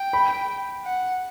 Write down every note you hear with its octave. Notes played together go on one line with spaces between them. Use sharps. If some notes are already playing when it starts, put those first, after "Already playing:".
Already playing: G5
B5
F#5